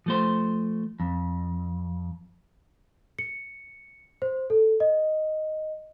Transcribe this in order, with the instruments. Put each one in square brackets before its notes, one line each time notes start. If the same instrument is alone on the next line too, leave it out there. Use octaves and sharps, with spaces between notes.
[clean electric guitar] F3 A3 C5
F2
[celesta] C#7
C5
A4
D#5